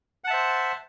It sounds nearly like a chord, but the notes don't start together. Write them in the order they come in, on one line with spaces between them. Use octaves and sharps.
F#5 A5 E5 C5